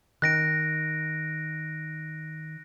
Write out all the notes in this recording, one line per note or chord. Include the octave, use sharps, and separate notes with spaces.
D#3 G5 F#6 A#6 D7